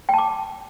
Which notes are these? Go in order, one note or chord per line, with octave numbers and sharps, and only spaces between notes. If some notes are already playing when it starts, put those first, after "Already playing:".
G5 A5 D6